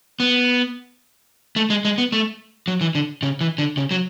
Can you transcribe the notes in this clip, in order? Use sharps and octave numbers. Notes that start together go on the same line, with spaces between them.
B3
A3
G#3
G#3
B3
A3
F#3
E3
D3
C#3
E3
D3
C#3
F#3